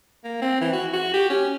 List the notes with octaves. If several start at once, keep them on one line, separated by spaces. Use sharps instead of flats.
A#3
C4
E3
F#4
F#4
G4
C#4